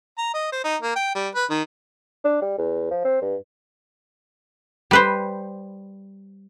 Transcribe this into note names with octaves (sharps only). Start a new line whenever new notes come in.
A#5
D#5
C5
D#4
A#3
G5
G3
B4
D#3
D4
G3
E2
F3
C4
G2
G3 B4 C5